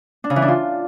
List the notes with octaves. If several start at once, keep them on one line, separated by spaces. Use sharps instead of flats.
D4
C#3
E3
D4
F4